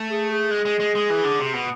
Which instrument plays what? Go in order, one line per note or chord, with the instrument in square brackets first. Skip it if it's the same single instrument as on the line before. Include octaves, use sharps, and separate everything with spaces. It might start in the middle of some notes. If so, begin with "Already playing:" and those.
Already playing: [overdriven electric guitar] A3
[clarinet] G#4
G#4
[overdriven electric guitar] G#3
G#3
G#3
G#3
E3
D3
C3
B2